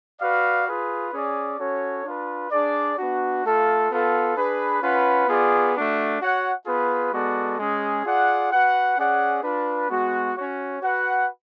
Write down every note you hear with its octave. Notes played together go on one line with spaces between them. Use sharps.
F#4 B4 D5 F5
F4 G#4 B4
C#4 G#4 D5
C#4 F#4 A4 C#5
D4 F4 B4
D4 G#4 D5
B3 D4 F#4
A3 F4 A4 F5
B3 F4 A4 F5
D4 G#4 B4
C#4 F4 B4 F#5
B3 F4 G#4 D5
A3 D4 F#4
F#4 C#5 F#5
B3 F4 G#4 B4
G#3 B3 F#4 A4 D5
G#3 C#4 G#4
F4 G#4 D5 F#5
F#4 B4 F#5
C#4 G#4 D5 F#5
D4 F4 B4
G#3 B3 F#4
C#4 F#4 C#5
F#4 B4 F#5